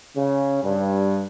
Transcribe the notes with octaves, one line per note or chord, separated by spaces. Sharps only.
C#3
G2